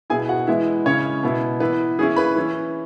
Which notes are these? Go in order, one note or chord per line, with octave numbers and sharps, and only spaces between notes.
B2 B3 E4 G#4 G#5
F#4 F#5
E3 G#3 B3 E4 E5
C#3 G#3 C#4 E4 C#5
B2 B3 E4
E3 B3 E4 B4
E3 C#4 E4 G#4
B4 B5
E3 C#4 E4